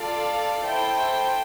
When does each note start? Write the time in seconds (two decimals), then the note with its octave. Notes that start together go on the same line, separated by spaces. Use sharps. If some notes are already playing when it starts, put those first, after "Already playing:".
Already playing: F4 A4 D5 F5
0.63 E4 A4 C5 G5